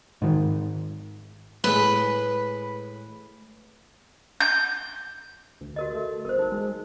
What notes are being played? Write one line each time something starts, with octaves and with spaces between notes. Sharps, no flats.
G#2 D#3
A2 G#3 B4
G6
D2
F#4 A#4 D#5
A3
G1 A#4 C5
D#4
G#3